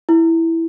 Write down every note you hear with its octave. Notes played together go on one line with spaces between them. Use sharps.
E4